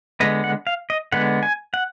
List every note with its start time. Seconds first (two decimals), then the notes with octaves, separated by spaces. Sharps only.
0.20 D3 G#3 B3 D#5
0.44 F#5
0.67 F5
0.90 D#5
1.12 D3 G#3 B3 F#5
1.43 G#5
1.74 F#5